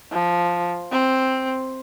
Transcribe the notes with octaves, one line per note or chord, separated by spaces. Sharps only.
F3
C4